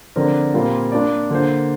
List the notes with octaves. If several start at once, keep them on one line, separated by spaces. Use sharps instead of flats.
D3 F3 C4 A#4 D5
A#2 G3 C4 F4 A#4
A#3 D4 F4 D5
D3 A#3 F4 C5